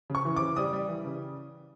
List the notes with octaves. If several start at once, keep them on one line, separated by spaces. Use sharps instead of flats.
C#3
C#6
E3
C#3 D6
G3 D#6
G3
E3
C#3